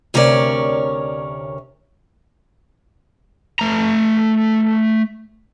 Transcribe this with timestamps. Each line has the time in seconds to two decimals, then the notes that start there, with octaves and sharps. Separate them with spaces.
0.14 D2 C3 C#4 A#4 C#5 D5
3.59 A3 A#5